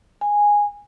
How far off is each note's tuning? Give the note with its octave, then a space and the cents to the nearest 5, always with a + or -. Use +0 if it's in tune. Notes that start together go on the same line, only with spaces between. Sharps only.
G#5 -10